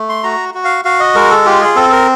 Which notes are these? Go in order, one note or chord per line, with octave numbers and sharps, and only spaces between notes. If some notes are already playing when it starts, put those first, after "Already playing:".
Already playing: A3
C6
F#4 A#5
F#4
F5
F#4 F5
D#5
G#3 A#4
A4
F4 G4
G#4
C4 A4
A#4